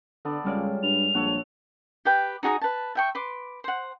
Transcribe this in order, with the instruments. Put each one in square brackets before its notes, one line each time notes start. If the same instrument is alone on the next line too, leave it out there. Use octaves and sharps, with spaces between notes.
[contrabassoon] D3 [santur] B3 A4 D5
[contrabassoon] C#2 [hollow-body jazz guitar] G3 G#3 D5 [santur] C4 C#4 F4
[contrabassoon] G2 [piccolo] F7
[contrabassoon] A#1 [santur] A4 C#5 F#5
[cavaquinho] G4 B4 G5
D#4 F#4 G#4 A#5
B4 A5
E5 G5 C#6
B4 C6 D6
C5 F#5